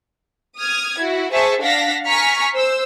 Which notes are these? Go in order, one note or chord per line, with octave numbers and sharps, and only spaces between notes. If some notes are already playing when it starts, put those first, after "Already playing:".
D#6 F6 G#6
E4 F#4
G#4 C5 E5 A5 C#6
D4 F5 F#5 A#6 B6
G#5 A#5 C#6 F6 B6
C5 E6